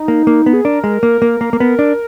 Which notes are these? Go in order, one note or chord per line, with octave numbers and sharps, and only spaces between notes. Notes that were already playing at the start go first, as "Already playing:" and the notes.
Already playing: D#4
A#3
A#3
B3
G#4
D4 A#4
G#3
A#3
A#3
A#3
A#3
B3
D4